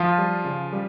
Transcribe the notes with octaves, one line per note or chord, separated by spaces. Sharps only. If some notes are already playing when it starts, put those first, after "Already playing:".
Already playing: F3 F4
G3
C#3
G3